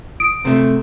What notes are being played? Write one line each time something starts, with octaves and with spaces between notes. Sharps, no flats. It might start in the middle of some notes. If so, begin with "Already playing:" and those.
D#6 D7
C3 A3